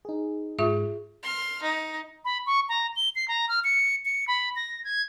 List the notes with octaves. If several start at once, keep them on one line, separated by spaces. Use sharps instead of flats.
D#4 G#4
G#2 F4 G#4 E5
C6 F6
D#4
B5
C#6
A#5
G7
C7
A#5
F6
C#7
C#7
B5
A#6
G#6